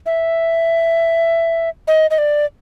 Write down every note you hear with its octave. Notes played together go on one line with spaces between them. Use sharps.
E5
D#5
D#5
D5